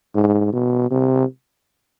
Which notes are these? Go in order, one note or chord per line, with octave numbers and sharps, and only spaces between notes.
G#2
B2
C3